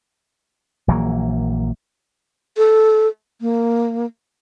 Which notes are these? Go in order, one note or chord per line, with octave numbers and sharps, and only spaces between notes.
A#1 E3 F#3 A#3
A4
A#3